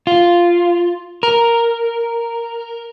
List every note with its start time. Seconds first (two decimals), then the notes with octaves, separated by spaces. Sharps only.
0.07 F4
1.23 A#4